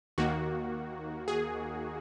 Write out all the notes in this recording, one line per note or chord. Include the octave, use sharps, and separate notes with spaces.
D#2 D#3 A#3 F#4
G#4